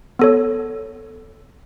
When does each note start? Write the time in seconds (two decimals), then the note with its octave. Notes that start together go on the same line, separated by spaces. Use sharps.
0.19 B3 A4 C#5